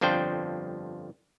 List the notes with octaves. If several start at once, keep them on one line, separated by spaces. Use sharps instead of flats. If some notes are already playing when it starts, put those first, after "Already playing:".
G1 F2 F3 D4 C5 G5